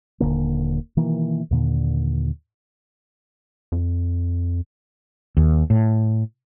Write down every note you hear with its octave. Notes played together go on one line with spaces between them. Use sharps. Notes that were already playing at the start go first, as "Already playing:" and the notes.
D#1 C#2 D3 A#3
B2 D#3 E3 A#3
D#2 A#2 D3
F2
D#2
A2